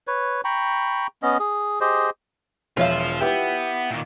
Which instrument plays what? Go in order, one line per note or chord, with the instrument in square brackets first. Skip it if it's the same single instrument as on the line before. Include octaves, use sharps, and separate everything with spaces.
[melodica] B4 C#5
G5 A#5 B5 C#6
B3 C#4 D#5
G#4
G4 G#4 C5 D#5
[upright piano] E1 E5 [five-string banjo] F3 C#5 F5 [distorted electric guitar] F4 C5
[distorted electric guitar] B3 [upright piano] E4 G4 B4
[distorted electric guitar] A#2 D#3